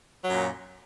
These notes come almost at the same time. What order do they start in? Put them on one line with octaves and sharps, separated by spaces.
F#3 F#2 A#2